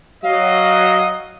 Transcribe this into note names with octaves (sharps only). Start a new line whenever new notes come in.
F#3 D#5 F5